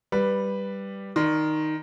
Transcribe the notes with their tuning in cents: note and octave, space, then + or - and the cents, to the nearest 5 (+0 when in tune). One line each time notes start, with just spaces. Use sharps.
G3 +0 B4 +0
D#3 +0 D5 +25 C6 -15